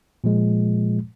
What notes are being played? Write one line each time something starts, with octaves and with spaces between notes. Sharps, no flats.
A#2 F3 G#3